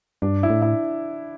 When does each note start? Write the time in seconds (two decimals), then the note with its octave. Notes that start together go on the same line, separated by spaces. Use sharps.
0.22 G2 D4
0.43 E4
0.50 A2
0.62 E4